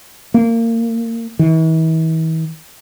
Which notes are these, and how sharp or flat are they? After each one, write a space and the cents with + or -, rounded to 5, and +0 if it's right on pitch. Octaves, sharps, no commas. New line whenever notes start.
A#3 -25
E3 -40